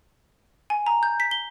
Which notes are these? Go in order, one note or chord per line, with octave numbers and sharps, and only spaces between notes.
G#5
A#5
G6
B6
G7